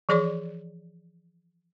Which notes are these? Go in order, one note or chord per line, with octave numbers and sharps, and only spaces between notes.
E3 F3 G#4 C#5 D5 C6